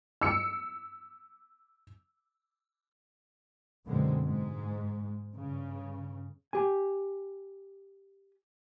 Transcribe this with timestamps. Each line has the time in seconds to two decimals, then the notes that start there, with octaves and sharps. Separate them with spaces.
0.21 E6 C#7
3.85 F#2 B2 D3 G#3 C4
4.22 G#2 G#3
5.33 G2 C#3
6.53 G4 G#5